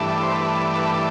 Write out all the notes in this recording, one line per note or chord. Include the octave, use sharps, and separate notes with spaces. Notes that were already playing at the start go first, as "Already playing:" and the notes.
Already playing: G2 E3 A3 D4
C5
B4
B4